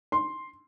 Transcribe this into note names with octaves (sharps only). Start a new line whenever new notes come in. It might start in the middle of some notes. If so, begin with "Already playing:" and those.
C6